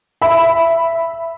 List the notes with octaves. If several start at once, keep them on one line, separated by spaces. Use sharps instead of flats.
E5 B5